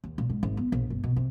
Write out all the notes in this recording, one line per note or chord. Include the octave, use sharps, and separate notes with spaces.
D#2
A#2
G#2
G#1
B3
A#1
G1
B2
C3